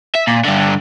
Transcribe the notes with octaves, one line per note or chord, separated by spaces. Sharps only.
E5
A#2
G2 D3